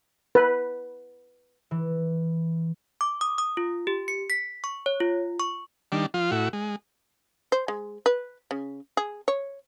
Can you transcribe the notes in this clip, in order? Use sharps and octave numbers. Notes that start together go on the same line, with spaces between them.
B4
E3
D6
D#6
D#6
F4
G4
C#7
B6
C#6
C#5
F4
C#6
D#3 G3 D4
F3 F4
A2 E4 F#4
G#3
C5
G#3
B4
C#3
G#4
C#5